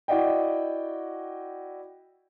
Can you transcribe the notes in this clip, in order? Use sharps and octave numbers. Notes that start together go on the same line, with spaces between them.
E4 F#4 D5 D#5 G5